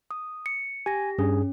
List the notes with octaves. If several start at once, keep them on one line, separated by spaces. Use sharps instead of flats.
D#6
C#7
G4 G#5 A#6
G2 C#4 G#4